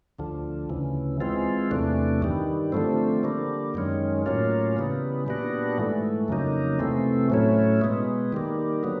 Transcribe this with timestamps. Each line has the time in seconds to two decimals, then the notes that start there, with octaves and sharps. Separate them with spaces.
0.19 D2 D3 F3
0.70 D2 C#3 E3
1.21 E3 G#3 C4 F4
1.71 E2 C3 E3 A3 D4
2.22 G2 D#3 G3
2.72 D3 F3 A3 C4
3.23 D3 G3 A#3
3.74 F#2 D#3 G#3 C#4
4.26 A2 F#3 A#3 C#4 F4
4.77 C#3 E3 G3 B3
5.27 A#2 G3 B3 D4 F#4
5.78 G#2 E3 A3
6.28 F2 C#3 F#3 A#3 D#4
6.79 C3 E3 A3 C4
7.30 A2 F#3 A3 C#4 E4
7.81 B2 G#3 B3
8.33 D#3 G3 A#3
8.83 D3 F#3 B3